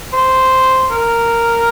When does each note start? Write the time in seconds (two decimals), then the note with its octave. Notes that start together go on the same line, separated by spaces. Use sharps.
0.13 C5
0.91 A#4